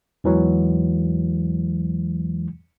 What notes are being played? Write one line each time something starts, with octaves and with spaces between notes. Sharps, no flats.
E2 E3 F#3 G#3